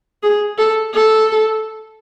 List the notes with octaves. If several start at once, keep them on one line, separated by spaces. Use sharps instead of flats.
G#4
A4
A4